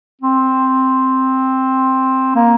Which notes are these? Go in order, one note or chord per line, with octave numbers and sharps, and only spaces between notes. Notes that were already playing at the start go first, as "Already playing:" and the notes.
C4
A#3